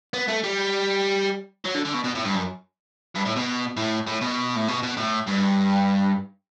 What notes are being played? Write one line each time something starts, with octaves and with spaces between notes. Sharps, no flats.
B3
A3
G3
F#3
D3
D3
B2
B2
A2
G2
F#2
G2
A2
B2
A2
A2
B2
A2
B2
B2
A2
G2